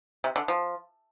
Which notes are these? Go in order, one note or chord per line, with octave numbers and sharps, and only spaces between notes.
C3
D3
F3